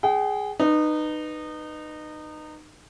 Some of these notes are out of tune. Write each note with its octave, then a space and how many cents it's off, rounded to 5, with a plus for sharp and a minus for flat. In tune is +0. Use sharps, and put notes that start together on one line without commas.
G#4 +0 G5 -40
D#4 -25 B4 +0